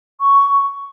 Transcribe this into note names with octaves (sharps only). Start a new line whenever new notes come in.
C#6